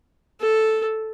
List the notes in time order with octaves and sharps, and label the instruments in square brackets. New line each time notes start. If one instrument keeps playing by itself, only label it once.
[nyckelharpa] A4